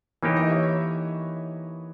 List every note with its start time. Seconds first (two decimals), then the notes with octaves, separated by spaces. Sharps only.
0.23 E3 A#3 D#4 G4 A#4 C#5
0.36 B4 D#5
0.49 C#5 E5
0.62 C#5 E5